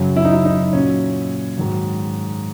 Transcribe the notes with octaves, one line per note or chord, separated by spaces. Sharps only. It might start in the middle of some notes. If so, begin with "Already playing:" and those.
Already playing: F#2 C#3 F#3
E4
D#4
E4
D#4
A#2 F#3 C#4
G#2 D#3 F#3